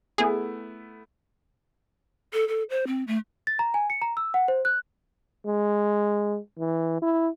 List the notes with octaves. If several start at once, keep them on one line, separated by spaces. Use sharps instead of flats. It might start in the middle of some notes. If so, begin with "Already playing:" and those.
A3 B3 E4 G#4
A4
A4
C5
C4
A3
A6
A#5
G#5
C#7
A#5
E6
F#5
C5
F#6
G#3
E3
E4